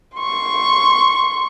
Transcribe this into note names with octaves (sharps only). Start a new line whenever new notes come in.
C6 C#6